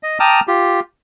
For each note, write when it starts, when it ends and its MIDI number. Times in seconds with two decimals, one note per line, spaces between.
0.03 0.18 75
0.20 0.40 79
0.20 0.40 81
0.20 0.40 82
0.20 0.40 86
0.20 0.40 87
0.20 0.40 89
0.48 0.80 65
0.48 0.80 67